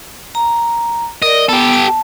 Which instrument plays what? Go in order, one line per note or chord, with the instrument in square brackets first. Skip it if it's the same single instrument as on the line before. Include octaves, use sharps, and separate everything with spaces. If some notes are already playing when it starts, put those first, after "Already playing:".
[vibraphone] A#5
[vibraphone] A#4 D5 [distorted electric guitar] D#5
[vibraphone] B3 [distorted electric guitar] G4 A4
[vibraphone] A5